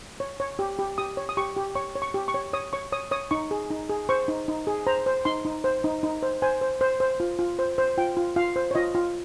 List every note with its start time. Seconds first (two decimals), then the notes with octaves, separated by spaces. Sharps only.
0.20 C#5
0.40 C#5
0.59 G4
0.79 G4
0.98 G4 D#6
1.17 C#5
1.29 D#6
1.37 G4 C#6
1.56 G4
1.75 C#5 C#6
1.95 C#5
2.02 C#6
2.14 G4
2.28 C#6
2.34 C#5
2.53 C#5 D#6
2.73 C#5 C#6
2.92 C#5 D#6
3.11 C#5 D#6
3.31 D#4 C#6
3.51 G#4
3.70 D#4
3.89 G#4
4.09 C5 C#6
4.28 D#4
4.48 D#4
4.67 G#4
4.87 C5 A#5
5.06 C5
5.25 D#4 C6
5.45 D#4
5.64 C5
5.84 D#4
6.03 D#4
6.23 C5
6.42 C5 G#5
6.61 C5
6.81 C5
7.00 C5
7.20 F4
7.39 F4
7.59 C5
7.78 C5
7.98 F4 G5
8.17 F4
8.36 F4 F5
8.56 C5
8.71 C#5
8.75 F4 D#5
8.95 F4